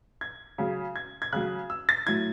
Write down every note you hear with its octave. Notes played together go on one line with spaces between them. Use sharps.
G#6
C#3 F#3
G#6
G#6
C#3 F#3 F#6
E6
A6
A2 F#3 G#6